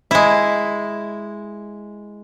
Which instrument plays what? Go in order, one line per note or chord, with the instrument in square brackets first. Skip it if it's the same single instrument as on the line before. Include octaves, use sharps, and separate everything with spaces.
[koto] G#3 E4